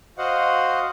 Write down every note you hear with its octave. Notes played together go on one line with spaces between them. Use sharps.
F#4 C5 D#5 F5 F#5